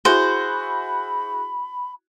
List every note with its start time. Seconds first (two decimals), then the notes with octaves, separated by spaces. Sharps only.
0.05 E4 F#4 G#4 C5 B5